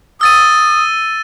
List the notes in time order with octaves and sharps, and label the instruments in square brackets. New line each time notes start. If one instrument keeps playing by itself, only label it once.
[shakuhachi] D#6 [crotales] E6 A6 D#7